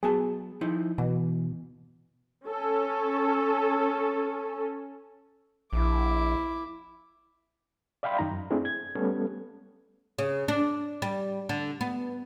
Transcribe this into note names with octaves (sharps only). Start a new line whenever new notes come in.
F#3 B3 G#4 A5
F3 D#4 E4
B2 E3
C#4 A4
A#1 E4 D6
D5 E5 F5 G5 B5 C6
F#2 D#3 D#4 A#5
F#2
A3 C4 D4 E4 G#4
G#6
G3 A3 B3 C#4 A4
C#3
D4
G3
D3
B3